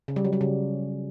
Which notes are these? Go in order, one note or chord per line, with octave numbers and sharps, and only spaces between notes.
C#3
G3
F#3
G3
C#3